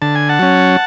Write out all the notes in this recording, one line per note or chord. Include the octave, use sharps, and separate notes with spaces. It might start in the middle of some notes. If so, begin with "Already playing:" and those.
D3 A5
G#5
F#5 A5
F#3 C#4